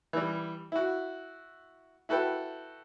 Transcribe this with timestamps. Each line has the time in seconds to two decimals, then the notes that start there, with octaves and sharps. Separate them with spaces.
0.13 E3 G3
0.72 E4 F#4
2.09 E4 F#4 A4 B4 G5